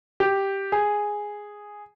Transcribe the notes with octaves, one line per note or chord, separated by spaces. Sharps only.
G4
G#4